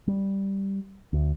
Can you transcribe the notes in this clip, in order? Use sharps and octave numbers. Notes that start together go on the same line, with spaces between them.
G3
D2